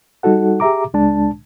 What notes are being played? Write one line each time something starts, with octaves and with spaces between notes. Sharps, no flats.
G3 D#4 F#4 A4 F#5
G4 G#4 E5 A#5 D6
C#2 G#3 D4 A5